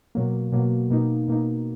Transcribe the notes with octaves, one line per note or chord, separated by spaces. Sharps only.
B2 F#3 A#3
B2 F#3 A#3
B2 A#3 D#4
B2 A#3 D#4